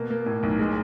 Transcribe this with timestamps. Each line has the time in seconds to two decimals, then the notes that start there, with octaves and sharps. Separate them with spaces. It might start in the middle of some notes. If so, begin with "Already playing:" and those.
Already playing: B2 A#3
0.10 A#3
0.26 A2
0.43 B1
0.59 G#3